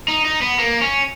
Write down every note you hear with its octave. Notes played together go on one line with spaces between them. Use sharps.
D#4
D#4
B3
A#3
C#4